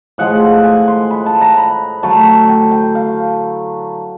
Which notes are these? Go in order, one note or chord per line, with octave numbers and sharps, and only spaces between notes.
A2 F3 G#3 F#5
G#5
C6
B5
A5
A#5
B5
D3 F#3 A3 A5
G5
G5
F5